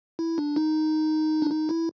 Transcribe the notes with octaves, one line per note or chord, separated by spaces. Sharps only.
E4
D4
D#4
D4
D#4
E4